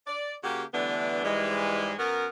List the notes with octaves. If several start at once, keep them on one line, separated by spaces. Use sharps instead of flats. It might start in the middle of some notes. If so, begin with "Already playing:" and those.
D5
C#3 A#3 F#4 G4
D3 E3 G3 A3 B3 D4
G#2 E3 G3 G#3
F#2 B3 F#4 A#4